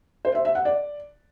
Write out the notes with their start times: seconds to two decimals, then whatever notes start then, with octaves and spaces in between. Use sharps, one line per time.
0.25 C5
0.35 E5
0.45 E5
0.55 F#5
0.65 D5